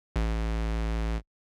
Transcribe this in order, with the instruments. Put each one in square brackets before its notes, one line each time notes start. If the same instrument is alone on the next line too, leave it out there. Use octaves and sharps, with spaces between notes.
[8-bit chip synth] A1